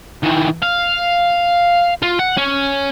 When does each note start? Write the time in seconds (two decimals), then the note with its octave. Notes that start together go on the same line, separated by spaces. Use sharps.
0.23 D#3 E3
0.62 F5
2.02 F4
2.19 F#5
2.37 C#4